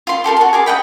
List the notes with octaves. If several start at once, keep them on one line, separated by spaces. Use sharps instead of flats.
F4 C6
G4 A4 A#4 C6
F#4 A5
G#4 A#4 D6
D#5 F#5 G5 B5